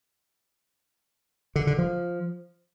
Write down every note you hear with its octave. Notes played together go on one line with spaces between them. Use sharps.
D3
D3
F3